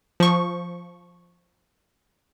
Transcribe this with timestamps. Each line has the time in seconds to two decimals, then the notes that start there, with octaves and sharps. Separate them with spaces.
0.20 F3 C#6